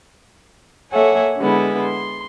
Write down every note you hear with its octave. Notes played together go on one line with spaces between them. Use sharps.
A#3 A4 C#5 E5 F#5 G#5
D3 G#3 B3 E4
C6